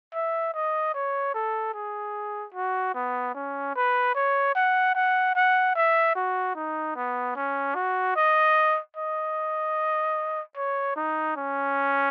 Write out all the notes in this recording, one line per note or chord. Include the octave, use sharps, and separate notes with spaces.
E5
D#5
C#5
A4
G#4
F#4
B3
C#4
B4
C#5
F#5
F#5
F#5
E5
F#4
D#4
B3
C#4
F#4
D#5
D#5
C#5
D#4
C#4